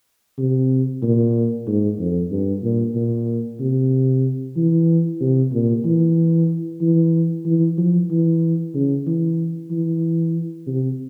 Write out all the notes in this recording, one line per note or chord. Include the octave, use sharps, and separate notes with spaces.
C3
A#2
G#2
F2
G2
A#2
A#2
C3
E3
C3
A#2
E3
E3
E3
F3
E3
C#3
E3
E3
C3